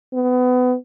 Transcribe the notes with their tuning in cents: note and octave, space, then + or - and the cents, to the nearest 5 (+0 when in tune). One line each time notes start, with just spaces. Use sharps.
B3 +25